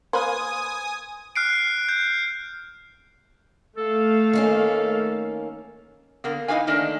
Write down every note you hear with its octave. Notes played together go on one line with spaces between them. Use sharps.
A#3 B4 C5 G#5 D#6
F6 F#6 C7 D7
G6
A3 A4 F5
D#3 A#3 C#4
D3 A#3 B3
D#4 E4 G4 B4 F5 G#5
D#3 A3 A#3 D4 D#4